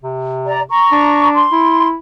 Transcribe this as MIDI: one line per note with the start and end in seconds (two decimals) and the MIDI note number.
0.03 0.68 48
0.47 0.62 74
0.47 0.62 82
0.70 1.29 82
0.70 1.29 85
0.92 1.45 62
1.34 1.88 84
1.52 1.96 64